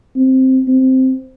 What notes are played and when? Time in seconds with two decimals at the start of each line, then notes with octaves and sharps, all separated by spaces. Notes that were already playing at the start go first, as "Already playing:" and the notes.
0.16 C4
0.68 C4